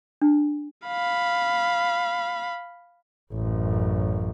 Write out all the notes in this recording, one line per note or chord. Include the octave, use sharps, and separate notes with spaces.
D4
F5 B5
A1 F#2